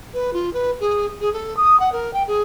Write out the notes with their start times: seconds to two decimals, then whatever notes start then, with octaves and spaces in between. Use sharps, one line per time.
0.14 B4
0.33 F4
0.53 B4
0.80 G#4
1.21 G#4
1.33 A4
1.57 D#6
1.80 F#5
1.92 A#4
2.13 G5
2.27 G#4